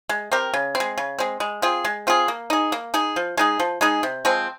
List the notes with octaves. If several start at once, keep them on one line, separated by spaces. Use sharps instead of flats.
G#3
C4 G4 A#4
C#3
C4
G#3
C#3
G#3 C4
G#3
C4 F4 G#4
G#3
C4 F4 G#4
A#3
D#4 G#4
A#3
D#4 G#4
F3
G#3 D#4 G#4
F3
G#3 D#4 G#4
C3
F3 G#3 C4